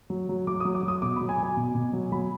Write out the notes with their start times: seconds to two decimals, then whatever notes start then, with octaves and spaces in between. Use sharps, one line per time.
0.10 F#3
0.29 F#3
0.47 F#3 D6
0.60 F#3 D#6
0.75 D6
0.83 F#3
0.88 D#6
1.02 B2 D6
1.16 F#3 B5
1.29 G#5
1.38 F#3
1.43 G#5
1.57 B2
1.75 B2
1.93 F#3
2.12 F#3 B5